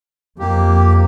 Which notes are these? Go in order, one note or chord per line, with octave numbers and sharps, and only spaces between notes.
F2 A#3 G4